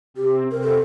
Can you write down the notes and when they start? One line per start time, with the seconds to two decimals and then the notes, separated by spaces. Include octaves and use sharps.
0.16 C3 C4 G4
0.46 C3 C4 A#4
0.62 A4